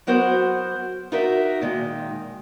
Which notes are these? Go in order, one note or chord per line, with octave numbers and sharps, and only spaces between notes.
F#3 B3 F#4 A#4 C5 F#5
D#4 F4 F#4 A#4 D5 E5
A#2 D#3 G#3